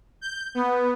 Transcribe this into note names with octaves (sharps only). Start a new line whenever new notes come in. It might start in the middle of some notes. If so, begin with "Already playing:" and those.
G6
B3